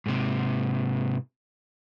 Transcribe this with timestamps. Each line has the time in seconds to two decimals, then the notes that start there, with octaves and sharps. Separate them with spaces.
0.06 G#2 C3